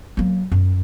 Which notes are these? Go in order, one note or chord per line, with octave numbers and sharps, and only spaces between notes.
F#3 A#3
F#2